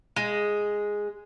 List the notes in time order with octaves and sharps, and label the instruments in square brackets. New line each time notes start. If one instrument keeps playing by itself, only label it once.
[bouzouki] G#3